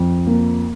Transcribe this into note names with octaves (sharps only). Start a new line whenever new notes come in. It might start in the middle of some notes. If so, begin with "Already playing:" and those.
Already playing: F2
A#3